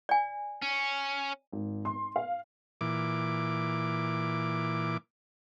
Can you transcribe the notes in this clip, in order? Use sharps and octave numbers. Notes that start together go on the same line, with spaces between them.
D5 G#5
C#4
G#1
C6
F5
A#2 E3 D6